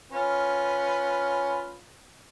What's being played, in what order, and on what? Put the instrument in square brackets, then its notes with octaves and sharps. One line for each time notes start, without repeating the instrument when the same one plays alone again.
[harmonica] C#4 F4 B4